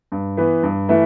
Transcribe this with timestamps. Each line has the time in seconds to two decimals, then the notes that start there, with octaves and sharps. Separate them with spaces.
0.12 G2
0.37 E3 B3
0.63 G2
0.89 E3 A3 E4 B4